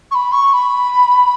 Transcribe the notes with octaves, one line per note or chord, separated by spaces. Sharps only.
C#6
B5
C#6
B5